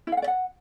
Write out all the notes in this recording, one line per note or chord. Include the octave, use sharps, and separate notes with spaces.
E4
F5
F#5
D5
F#5